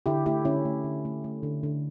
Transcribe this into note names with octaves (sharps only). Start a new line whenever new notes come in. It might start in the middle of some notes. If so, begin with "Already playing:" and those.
D3 E4 G4
A3 E4 G4
D3 C#4 E4
A3
D3
A3
A3
D3
D3